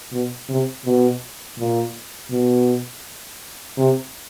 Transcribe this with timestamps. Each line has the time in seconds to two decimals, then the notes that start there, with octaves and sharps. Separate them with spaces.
0.12 B2
0.48 C3
0.85 B2
1.58 A#2
2.30 B2
3.78 C3